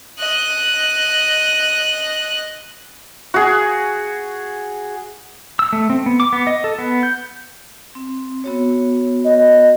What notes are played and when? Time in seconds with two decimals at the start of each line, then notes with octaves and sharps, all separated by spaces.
0.19 D#5 F#6
3.34 F#4 G#4
5.59 E6
5.73 A3
5.90 C4
6.06 B3
6.20 D6
6.33 B3
6.47 D#5
6.64 A4
6.78 B3
7.03 G6
7.95 C4
8.44 B3 F#4 C#5
9.25 D#5